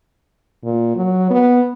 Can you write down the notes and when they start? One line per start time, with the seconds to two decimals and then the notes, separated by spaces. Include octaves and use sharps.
0.64 A#2
0.96 F#3
1.30 B3